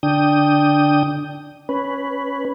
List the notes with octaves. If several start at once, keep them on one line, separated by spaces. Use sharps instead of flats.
D3 D4 G5 D#6
C#4 B4